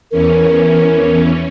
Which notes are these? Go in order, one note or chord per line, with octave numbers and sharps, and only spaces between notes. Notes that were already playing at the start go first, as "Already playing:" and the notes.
E2 E3 C#4 A#4